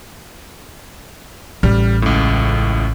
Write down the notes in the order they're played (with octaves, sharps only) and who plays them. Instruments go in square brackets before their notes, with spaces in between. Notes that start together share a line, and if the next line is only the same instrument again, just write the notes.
[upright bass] A1 [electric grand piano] G3 F6
[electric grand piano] C#2 A2